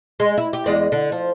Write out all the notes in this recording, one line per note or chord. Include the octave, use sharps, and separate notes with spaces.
G#3
E4
G4
E2 G#3 D5
D3
F3